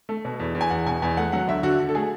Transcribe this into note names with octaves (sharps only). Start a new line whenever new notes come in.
A3
B2
E2
E2
G#5
E2 F#5
B2 G#5
E2 G#5
A3 F#5
F#3 F#5
D2 E5
D3 F#4
D3
A4
A3 G#4